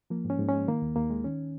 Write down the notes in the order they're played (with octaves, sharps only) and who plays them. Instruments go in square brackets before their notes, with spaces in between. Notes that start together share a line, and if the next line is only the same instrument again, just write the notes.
[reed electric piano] F3 A#3
G#2
C#4
G#2
G#3 C#4
D#3 A#3
D#2
D#2 A#3
G#3
D#3 C#4